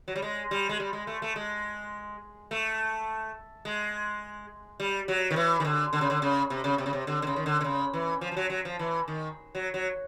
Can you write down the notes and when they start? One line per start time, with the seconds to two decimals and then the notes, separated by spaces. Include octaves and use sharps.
0.08 F#3
0.16 G3
0.22 G#3
0.51 G3
0.69 G#3
0.80 G3
0.93 G#3
1.07 A3
1.22 A3
1.36 G#3
2.51 A3
3.65 G#3
4.80 G3
5.08 F#3
5.31 D#3
5.36 E3
5.60 D#3
5.65 D3
5.93 D3
6.01 C#3
6.10 D3
6.22 C#3
6.50 C3
6.64 C#3
6.78 C3
6.86 C#3
6.93 C3
7.07 D3
7.22 D3
7.27 C#3
7.36 D#3
7.46 D3
7.61 D3
7.64 C#3
7.93 E3
8.21 F3
8.32 F3
8.37 F#3
8.50 F#3
8.65 F3
8.79 E3
9.08 D#3
9.55 F#3
9.74 F#3